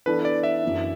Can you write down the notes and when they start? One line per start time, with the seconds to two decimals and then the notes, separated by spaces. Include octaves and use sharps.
0.06 E3 B3 D4 A4 B4
0.25 D5
0.43 E5
0.63 F#2 E3 D4